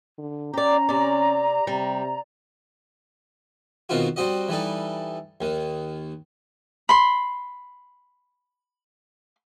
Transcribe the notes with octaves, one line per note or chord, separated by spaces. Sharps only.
D3
C#4 G4 D5 A#5
C3 D5
C3 G3
B2 D#3 C4 D#4 F4 F#4
G3 C4 F#4 D#5
E3 G3 D#4 A4
D#2 D#3
B5 C6